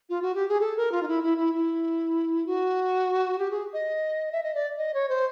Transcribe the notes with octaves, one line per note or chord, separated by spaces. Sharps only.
F4
F#4
G4
G#4
A4
A#4
F4
D#4
E4
E4
E4
E4
F#4
G4
G#4
D#5
E5
D#5
D5
D#5
C#5
C5